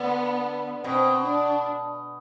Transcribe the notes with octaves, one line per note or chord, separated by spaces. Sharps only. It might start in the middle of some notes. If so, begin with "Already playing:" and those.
Already playing: D3 B3
B2 C4
D4